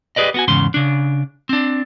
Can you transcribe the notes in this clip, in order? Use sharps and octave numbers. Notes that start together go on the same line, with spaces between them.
G4 G#4 B4 D5 D#5
B3 F#4 G#5
E2 G#2 C#3 C6
C#3 D4
C4 D4